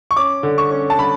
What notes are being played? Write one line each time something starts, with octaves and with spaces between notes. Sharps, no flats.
C#6
C#4 D6
D3
C#6
C#4
A5
D3 B5